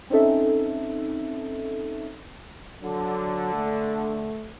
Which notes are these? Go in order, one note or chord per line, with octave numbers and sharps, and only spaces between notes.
C4 C#4 D#4 A4 E5
D3 F#3
A3